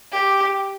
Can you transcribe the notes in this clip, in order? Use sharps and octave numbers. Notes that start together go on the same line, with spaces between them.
G4